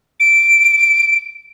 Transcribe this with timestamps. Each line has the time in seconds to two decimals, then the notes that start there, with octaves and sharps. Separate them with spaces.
0.20 D7